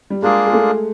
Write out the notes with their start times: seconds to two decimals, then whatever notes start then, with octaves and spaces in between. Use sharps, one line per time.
0.10 G3
0.22 G#3 A#3 D4 F4 G#4
0.46 G#3
0.53 A3